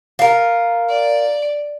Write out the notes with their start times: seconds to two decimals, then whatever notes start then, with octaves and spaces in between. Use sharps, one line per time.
0.19 F4 A#4
0.88 D5